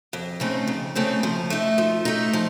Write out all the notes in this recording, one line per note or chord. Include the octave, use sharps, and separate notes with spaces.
F2
C#3 A3 C4 D#4
F2
C#3 A3 C4 D#4
F3
A3 D#4
F3
A3 D#4
F3